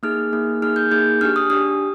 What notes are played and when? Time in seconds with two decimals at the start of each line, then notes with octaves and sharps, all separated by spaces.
0.03 A#3 D#4 G#4 F6
0.33 A#3 D#4 G#4
0.62 A#3 D#4 G#4 F6
0.76 G6
0.91 A#3 D#4 G#4 G6
1.21 D4 G4 F6
1.36 D#6
1.50 D4 G4 D#6